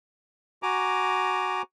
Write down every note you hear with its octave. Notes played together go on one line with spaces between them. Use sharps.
F#4 G#5 A#5 D6